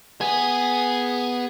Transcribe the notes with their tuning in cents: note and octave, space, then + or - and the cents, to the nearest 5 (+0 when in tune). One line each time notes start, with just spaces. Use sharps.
B3 +0 G#4 +0